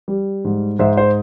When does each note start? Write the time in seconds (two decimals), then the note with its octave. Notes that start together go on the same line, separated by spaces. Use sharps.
0.08 G3
0.45 G#2
0.79 G#2 C5 E5
0.97 C5